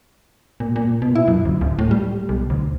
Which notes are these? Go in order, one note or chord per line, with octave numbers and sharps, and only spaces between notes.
A#2
A#2
B2
E4
F#2
D2
D1
A2
G3
B1
D2